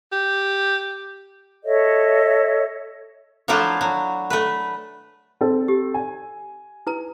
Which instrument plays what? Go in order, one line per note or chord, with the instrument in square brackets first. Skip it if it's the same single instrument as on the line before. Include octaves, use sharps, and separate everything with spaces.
[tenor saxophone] G4
[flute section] A4 C#5 D#5 E5
[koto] F3 F#3 A3 D4 E4 F4
F#3
A3 B4
[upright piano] C4 A4
[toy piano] G4
[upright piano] G#5
[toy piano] E4 B4 A#5